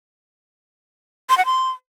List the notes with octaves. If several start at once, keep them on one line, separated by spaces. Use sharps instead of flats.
C6
F#5
C6